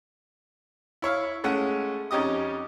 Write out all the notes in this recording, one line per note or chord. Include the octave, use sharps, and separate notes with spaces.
E4 C#5 E5 F5
G#3 A3 C#4 F#5
F2 C#4 D#4 G4 D#5 D#6